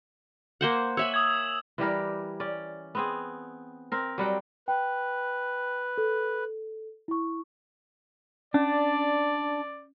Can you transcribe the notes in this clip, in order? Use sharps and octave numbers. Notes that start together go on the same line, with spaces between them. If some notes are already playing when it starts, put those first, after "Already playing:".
A#3 C5 F#5
C#5 E5 G#5 E6 F#7
D#6 G#6 E7
E3 G3 G4 A#4
C#4 D5
B3 C4 G#4
C4 A#4
F#3 G3 F#5 G5
B4 G5
A4
E4 C#6
C#4 D4 D5